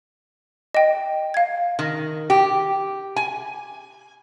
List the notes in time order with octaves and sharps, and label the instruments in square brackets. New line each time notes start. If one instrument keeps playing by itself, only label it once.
[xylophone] D#5 G5
F5 G#6
[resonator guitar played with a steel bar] D#3
G4
G#5